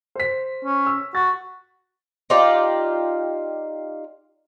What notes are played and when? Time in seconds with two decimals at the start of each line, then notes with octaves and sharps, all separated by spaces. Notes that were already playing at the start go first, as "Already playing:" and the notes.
0.15 C5 B6
0.65 C#4
0.86 E6
1.15 F#4 A6
2.30 D#4 F4 G4 D5